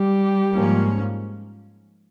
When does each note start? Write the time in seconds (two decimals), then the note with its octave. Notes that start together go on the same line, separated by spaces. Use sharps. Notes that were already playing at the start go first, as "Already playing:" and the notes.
Already playing: G3 G4
0.53 G#2 F3 A#3 C#4